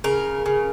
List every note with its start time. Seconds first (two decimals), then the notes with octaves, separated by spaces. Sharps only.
0.04 C#3 A#4
0.46 C#3